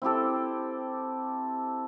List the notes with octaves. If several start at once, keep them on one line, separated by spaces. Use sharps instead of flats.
C4 E4 G4 A4